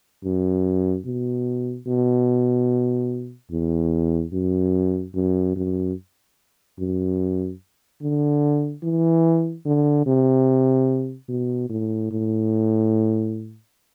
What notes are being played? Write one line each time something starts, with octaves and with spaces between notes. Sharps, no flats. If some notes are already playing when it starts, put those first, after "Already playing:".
F#2
B2
B2
E2
F#2
F#2
F#2
F#2
D3
E3
D3
C3
B2
A2
A2